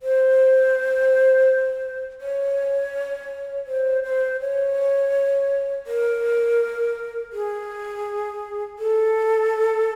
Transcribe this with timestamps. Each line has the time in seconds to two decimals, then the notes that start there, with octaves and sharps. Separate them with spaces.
0.02 C5
2.21 C#5
3.67 C5
4.04 C5
4.41 C#5
5.87 A#4
7.33 G#4
8.79 A4